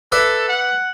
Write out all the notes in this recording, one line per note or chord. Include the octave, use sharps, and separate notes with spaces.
A4 B4 D5 E5
F#5